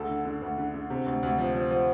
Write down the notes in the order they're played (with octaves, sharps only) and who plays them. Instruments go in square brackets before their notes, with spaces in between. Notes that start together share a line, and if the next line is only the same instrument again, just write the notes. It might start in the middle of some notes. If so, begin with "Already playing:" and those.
Already playing: [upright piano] D2 A4
D3
D3
D2
D3
D3
C3
D2
D2
F3
F3
F3